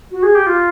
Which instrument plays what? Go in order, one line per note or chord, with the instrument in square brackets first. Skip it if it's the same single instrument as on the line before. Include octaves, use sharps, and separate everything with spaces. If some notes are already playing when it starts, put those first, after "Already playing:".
[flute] F#4
G#4
G4
F4